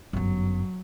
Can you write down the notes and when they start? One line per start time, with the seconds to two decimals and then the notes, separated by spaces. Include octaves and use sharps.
0.13 G1 F#2 F#3